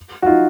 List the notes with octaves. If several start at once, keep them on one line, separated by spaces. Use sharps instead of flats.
F#4
D#4 F4